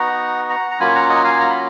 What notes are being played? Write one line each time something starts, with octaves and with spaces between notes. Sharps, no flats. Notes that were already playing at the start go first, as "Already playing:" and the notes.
Already playing: B3 D#4 F#4 F#5 A#5
F#5 A#5
A#5
F#3 A#3 C#4 F4 G#5 B5
F#5 A#5
D#5 F#5
F5 G#5
A#5
B5